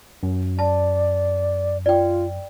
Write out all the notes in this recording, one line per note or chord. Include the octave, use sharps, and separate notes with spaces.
F#2
D5 A5
F4 D5 G5